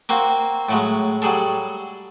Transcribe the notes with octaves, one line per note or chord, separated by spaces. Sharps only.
A#3 C4 F#4
A2 F#3 G#3
F#3 G3 G#4 A4